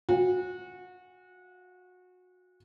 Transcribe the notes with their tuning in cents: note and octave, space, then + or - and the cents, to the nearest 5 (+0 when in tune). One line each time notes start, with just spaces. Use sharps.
F#4 -25 F5 +0 G#5 -40